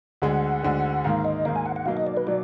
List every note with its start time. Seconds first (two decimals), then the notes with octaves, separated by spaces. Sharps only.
0.22 D2 D3 G#3 F#5
0.63 D2 D3 G#3
1.04 G#2 D#3 A#3 F5
1.25 D#5
1.45 G#2 D#3 A#3 F5
1.56 G#5
1.66 F#5
1.76 F#5
1.86 B2 F#3 A#3 D#4 F5
1.97 D#5
2.07 D5
2.17 B4
2.27 B2 F#3 D5